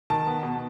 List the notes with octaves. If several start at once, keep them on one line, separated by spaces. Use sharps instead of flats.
D#3 A5
B3
B2